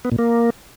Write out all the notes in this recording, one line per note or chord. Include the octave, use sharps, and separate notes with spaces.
B3
A#2
A#3